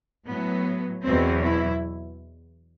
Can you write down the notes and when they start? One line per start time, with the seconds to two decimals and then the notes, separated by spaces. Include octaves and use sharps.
0.26 A2 F#3 B3
1.03 E2 B2 F#3 C4
1.42 E4